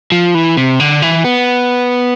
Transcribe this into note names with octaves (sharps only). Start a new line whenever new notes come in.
F3
E3
C3
D3
E3
B3